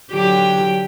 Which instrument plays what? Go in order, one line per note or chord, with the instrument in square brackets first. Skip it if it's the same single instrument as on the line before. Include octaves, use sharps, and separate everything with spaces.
[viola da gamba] D3 F#3 G4